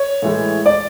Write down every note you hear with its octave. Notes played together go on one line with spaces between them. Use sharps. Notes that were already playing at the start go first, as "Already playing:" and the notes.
Already playing: C#5
A2 E3 G#3
D5